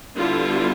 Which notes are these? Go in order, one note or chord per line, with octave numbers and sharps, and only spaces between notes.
D3 G3 B3 E4 F4